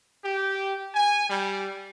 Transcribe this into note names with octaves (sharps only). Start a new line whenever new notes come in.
G4
G#5
G3